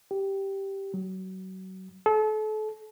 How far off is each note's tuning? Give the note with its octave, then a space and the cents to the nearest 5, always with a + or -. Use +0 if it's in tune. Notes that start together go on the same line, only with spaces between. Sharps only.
G4 -5
F#3 +25
A4 -35